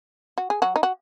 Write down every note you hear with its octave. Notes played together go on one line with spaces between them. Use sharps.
F#4
G#4
F#3 F#4
D#4
F#4